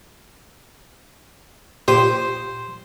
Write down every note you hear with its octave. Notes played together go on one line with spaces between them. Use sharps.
A#2 G4 C5 D#6